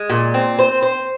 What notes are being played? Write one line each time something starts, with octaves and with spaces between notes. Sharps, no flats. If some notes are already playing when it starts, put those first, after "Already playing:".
Already playing: G#3
A#2
C4
C5
C5